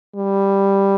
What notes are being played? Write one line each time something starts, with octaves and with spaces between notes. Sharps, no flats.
G3